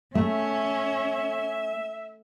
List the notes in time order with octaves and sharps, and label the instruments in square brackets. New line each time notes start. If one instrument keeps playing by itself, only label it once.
[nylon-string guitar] A3 [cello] C#4 [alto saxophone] E5